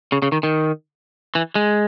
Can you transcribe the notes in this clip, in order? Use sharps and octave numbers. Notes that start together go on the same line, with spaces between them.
C#3
C#3
D#3
D#3
E3
G#3